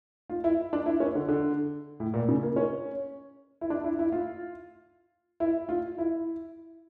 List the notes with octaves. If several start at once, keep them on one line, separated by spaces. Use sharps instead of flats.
F4
E4
D4
E4
C#4
D3
D3
A2
A#2
C#3
A#3
C#4
E4
D4
E4
E4
F4
E4
F4
E4